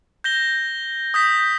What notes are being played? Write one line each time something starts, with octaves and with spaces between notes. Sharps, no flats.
G6 A#6 G7
D#6 G6 B6